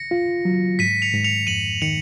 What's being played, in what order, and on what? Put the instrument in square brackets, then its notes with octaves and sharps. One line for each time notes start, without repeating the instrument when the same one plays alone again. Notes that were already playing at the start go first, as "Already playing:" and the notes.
Already playing: [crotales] A#6 C#7
[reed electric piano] F4
F#3
[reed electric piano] G#2 [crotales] B6 D#7
[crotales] C#7 F7
[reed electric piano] G#2
[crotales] C#7 F7
[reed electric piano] F2 [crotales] D#7 F#7
[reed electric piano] D#3 [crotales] C#7 F7